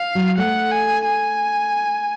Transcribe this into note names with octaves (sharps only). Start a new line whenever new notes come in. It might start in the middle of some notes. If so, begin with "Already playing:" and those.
Already playing: F5
F#3
A3 F#5
G#5
G#5